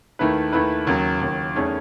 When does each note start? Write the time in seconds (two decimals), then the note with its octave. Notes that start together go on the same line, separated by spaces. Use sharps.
0.19 D#2 D#3 A3 E4 B4
0.52 D#2 D#3 A3 E4 B4
0.87 D#2 C#3 F#3
1.21 D#2 C#3 F#3
1.55 E2 D#3 A3 C#4 G#4